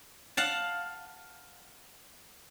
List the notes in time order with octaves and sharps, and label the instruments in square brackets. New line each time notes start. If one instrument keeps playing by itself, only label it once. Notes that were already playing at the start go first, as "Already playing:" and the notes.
[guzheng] F5 F#5 A5